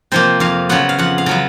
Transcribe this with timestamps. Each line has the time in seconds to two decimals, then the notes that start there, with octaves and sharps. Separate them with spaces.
0.12 C3 F3 A#3 C5
0.40 F2 F5
0.69 C#3 F#3 B3 F#5
0.89 F5
0.99 F2 F#5
1.18 F5
1.26 C#3 F#3 B3